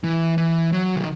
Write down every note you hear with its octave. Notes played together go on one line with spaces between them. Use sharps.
E3
E3
F#3
D#3